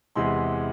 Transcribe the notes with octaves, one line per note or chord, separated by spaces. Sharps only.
E2 C3 E3 G#3 C6